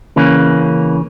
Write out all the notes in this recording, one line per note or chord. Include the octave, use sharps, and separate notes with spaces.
C#3 E3 A#3 C#4